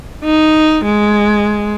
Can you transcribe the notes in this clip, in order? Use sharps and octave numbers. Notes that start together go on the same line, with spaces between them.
D#4
G#3